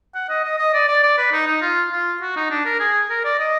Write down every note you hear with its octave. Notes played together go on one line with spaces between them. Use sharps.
F#5
D#5
D#5
D#5
D5
D5
D5
B4
D#4
D#4
F4
F4
F#4
D#4
D4
A#4
G#4
A#4
D5
D#5